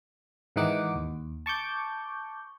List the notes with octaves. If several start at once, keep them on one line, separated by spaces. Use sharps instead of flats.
G#2 D#3 E3 D#4 F#5 D6
D#2
A5 C#6 D6 G6